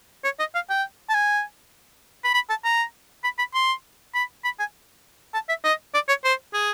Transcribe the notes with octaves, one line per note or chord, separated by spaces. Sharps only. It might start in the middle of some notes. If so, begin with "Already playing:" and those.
C#5
D#5
F5
G5
A5
G#5
B5
B5
A5
A#5
B5
B5
C6
B5
B5
G#5
A5
E5
D#5
D5
C#5
C5
G#4